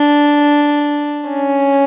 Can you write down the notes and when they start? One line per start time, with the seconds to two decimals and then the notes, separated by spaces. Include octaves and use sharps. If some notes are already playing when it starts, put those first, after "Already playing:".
Already playing: D4
1.29 C#4